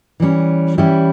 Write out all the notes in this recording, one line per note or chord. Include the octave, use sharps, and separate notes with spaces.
E3 G3 C#4
E3 G3 C#4 E4 G4